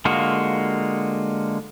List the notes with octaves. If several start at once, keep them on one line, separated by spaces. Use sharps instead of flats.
D3 G#3 A#3 F4 F#4